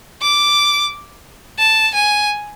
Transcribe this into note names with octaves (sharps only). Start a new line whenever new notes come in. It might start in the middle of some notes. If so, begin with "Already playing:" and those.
D6
A5
G#5